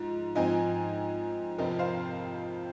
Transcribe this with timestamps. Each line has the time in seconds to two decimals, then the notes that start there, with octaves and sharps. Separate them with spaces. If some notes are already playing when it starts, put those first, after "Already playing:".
Already playing: G#2 F3
0.35 G#2 F3 C4 D#5 G#5
1.58 F2 C3 F3 C4 A#4 D#5
1.79 C5 F5